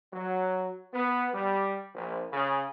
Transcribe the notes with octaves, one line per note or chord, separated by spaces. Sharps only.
F#3
B3
G3
A#1
C#3